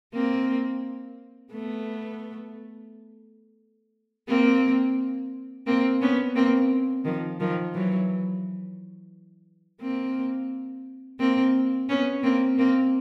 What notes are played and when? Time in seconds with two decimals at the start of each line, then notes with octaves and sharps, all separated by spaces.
0.14 A#3 C4
1.52 A3 B3
4.28 A#3 C4
5.67 A#3 C4
6.01 B3 C#4
6.35 A#3 C4
7.04 D#3 F3
7.40 D#3 F3
7.74 E3 F#3
9.81 A#3 C4
11.20 A#3 C4
11.89 B3 C#4
12.23 A#3 C4
12.58 A#3 C4